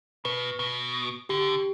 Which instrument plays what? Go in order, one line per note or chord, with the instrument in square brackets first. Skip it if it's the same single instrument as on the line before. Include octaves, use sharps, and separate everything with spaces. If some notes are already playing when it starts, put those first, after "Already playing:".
[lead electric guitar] B2 [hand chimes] B4
[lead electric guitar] B2
[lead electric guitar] D3 [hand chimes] G4